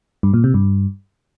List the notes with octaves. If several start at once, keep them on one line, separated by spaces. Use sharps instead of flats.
G2
A#2
C3
G2